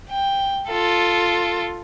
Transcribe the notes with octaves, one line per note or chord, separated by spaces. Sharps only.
G5
F4 A4